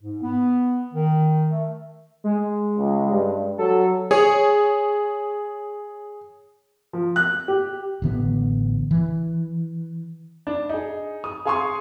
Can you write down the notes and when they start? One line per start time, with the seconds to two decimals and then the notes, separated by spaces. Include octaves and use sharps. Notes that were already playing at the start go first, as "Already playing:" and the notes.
0.01 G#2
0.22 B3
0.94 D#3
1.51 A3
2.24 G#3
2.78 C#2
3.10 G2
3.58 F#3 A4
4.11 G#4 C#5
6.93 F3
7.16 F#6
7.48 G4
8.02 A1 D3 B3
8.91 E3
10.47 D4
10.69 D#4 G#4
11.24 D#6
11.45 G#4 F5 G#5 C6 C#6 D#6